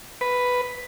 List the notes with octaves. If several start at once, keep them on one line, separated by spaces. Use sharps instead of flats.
B4